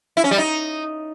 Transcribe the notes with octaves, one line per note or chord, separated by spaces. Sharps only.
E4
C#4
G3
D#4